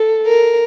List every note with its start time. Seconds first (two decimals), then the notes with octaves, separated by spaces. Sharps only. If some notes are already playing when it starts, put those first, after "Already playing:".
Already playing: A4
0.26 A#4